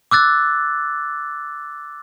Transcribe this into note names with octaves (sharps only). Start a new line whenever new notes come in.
D6 E6 F#6 A6